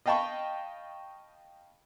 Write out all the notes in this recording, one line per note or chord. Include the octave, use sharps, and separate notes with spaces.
D#5 F5 G5 A5 B5 C#6